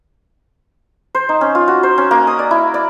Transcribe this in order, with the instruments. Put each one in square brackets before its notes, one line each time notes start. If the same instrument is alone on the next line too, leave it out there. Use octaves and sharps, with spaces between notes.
[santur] C5
D#4
C#4
F4
F#4
C5
C#4
A#3
D#6
D5
E4
D5